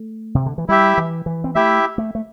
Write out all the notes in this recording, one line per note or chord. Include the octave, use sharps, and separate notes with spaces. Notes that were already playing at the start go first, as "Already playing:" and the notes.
Already playing: A3
C3
D3
E3
G3 E4 G4 E5
E3
E3
C4
A3 E4 G4 E5
A3
A3